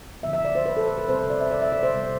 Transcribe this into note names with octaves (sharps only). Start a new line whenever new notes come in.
D3 F3 B3 E5
E5
D5
C5
B4
A4
B4
B4
C3 G3 C4 C5
C5
D5
E5
D5
E5
D5
C5
C3 G3 B3